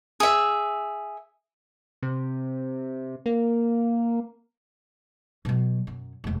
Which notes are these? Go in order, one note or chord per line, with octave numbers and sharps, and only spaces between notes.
G#4 E5
C3
A#3
B2 F#3
F#2
E1 D2